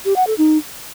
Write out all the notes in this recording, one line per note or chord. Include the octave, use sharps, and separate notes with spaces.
G4
F#5
A4
D#4